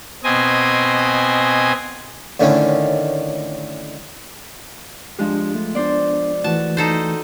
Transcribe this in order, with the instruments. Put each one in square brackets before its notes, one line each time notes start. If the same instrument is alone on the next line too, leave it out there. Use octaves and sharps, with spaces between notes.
[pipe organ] B2 C4 D#5 G#5
[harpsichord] A2 D3 D#3 A3 C#4
[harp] F3 G#3 [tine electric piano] D4 G4
[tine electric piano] A3
[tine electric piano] B3 D4 [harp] C5 D5
[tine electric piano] E3 A3 [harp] F#4 [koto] A5
[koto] D#4 A4 C5